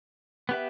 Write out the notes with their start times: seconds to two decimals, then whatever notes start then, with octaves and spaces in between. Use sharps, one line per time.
0.49 B3 G4 B4 E5